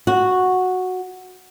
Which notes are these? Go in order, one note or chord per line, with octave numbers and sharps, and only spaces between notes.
F#4